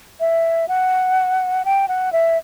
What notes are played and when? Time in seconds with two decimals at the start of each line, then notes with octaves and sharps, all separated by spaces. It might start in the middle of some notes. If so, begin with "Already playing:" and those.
0.20 E5
0.68 F#5
1.65 G5
1.88 F#5
2.12 E5